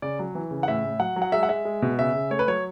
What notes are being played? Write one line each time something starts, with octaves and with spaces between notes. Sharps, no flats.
C#3 D5
F#3
E3
C#3
F#5
A2 E5
A2
F#3 F#5
F#3
F#5
G#3 E5
F#5
G#3 E5
G#3
B2
C#3 E5
C#3
A3 C#5
B4
F#3 C#5